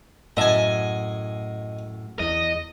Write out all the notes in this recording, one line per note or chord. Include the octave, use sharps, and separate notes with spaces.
F#2 A2 D#5 E5 G#5 A5
E2 D#5